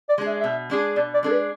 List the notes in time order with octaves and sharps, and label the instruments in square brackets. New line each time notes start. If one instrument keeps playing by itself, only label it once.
[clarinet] D5
[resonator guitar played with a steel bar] G#3 D4 G#4
[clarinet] E5
[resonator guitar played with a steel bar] B2 [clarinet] E5
[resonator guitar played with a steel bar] G#3 D4 G#4
[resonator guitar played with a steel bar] B2 [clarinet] D5
[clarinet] D5
[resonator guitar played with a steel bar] G#3 D4 G#4 [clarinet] A4
[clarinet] B4